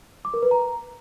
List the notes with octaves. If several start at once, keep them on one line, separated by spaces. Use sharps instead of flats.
D6
A#4
B4
A#5